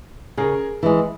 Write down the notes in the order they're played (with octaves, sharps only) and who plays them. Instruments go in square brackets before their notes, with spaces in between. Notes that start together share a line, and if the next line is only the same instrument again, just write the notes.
[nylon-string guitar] C#3 [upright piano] G#4 A#4
[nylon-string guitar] E3 G#3